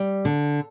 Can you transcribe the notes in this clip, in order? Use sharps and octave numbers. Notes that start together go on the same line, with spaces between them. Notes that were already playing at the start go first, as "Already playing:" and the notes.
Already playing: G3
D3